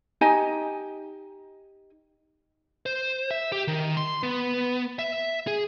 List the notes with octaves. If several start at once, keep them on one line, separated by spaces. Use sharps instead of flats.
D#4 G4 D#5 G#5
C5
E5
G4
D#3
C6
B3
E5
G#4